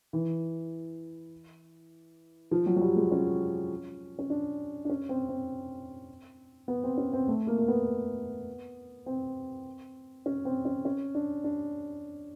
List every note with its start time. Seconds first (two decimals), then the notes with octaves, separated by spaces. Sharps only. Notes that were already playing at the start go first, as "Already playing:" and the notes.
0.13 E3
2.51 F3
2.66 F#3
2.76 F#3
2.81 G3
2.96 G#3
3.12 C#4
4.19 C#4
4.30 D4
4.85 D4
4.90 C#4
5.09 C4
5.29 C4
6.68 B3
6.84 C4
6.98 C#4
7.13 C4
7.28 A3
7.47 A#3
7.58 A#3
7.68 B3
9.06 C4
10.26 C#4
10.45 C4
10.65 C#4
10.85 C#4
11.15 D4
11.44 D4